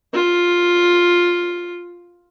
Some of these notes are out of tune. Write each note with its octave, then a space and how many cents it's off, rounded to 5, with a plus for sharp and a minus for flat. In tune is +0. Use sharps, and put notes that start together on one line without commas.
F4 +5